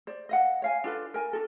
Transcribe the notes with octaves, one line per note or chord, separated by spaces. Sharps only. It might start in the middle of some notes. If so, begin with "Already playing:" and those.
C5 D5
D#5 F5 F#5
C#5 F5 G#5
D4 F4 A4 B4
A#4 G#5
D4 F#4 A4